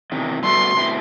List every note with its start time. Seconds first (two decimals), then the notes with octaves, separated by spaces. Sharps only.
0.12 E2 C3 D#3
0.43 G3 B3 F#4 A4 E5 C6
0.77 B2 A3 C4 E4